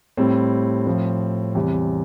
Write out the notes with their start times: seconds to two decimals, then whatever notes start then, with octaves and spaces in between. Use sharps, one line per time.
0.17 A2 G3 C4
0.87 A2 F3
1.55 E2 C3 G3